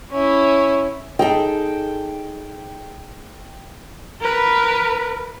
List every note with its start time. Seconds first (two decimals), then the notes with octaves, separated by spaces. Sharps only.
0.11 C#4 E4
1.19 D#4 G#4 A4 G5
4.21 A#4 B4